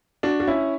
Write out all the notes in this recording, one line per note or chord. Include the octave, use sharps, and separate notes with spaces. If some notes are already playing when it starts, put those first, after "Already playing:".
D4 F#4
F#4
C#4 E4